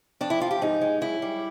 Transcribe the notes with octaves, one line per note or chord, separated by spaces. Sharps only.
F2 D4
E4
F3 F4
G4
G#2 D#4
G#3
F#2 E4
G3